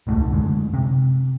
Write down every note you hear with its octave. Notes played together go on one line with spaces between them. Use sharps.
D#1 C2 G#2 A3
F#2 D3 G#3
C3